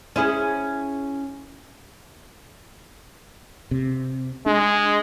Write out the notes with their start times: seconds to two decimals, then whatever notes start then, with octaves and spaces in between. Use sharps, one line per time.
0.16 C#4 E4 G#4
3.71 C3
4.46 G#3 D4